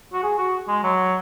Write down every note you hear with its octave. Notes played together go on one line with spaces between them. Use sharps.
F#4
G#4
F#4
G#3
F#3